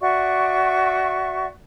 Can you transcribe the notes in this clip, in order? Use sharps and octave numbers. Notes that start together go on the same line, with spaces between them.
F#4 D5 E5 C#6